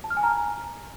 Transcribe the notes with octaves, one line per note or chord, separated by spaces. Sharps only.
A5
F6
G#5
A#5